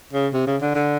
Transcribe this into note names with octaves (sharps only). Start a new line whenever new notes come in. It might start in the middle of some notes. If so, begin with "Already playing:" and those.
C#3
C3
C#3
D3
D3